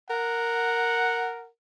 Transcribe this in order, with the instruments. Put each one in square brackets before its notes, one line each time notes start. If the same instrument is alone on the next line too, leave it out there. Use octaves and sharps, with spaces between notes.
[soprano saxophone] A#4 [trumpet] F#5